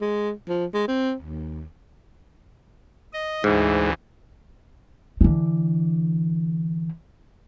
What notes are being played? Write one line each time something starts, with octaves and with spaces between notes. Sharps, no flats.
G#3
F3
G#3
C4
D#2
D#5
D2 G#2 E3
D3 E3